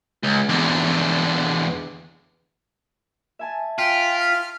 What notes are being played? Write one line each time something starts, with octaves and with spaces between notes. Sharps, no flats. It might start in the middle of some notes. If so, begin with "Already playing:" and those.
C#2
E2 D3
E5 G#5 A5
F4 G5 B6
F6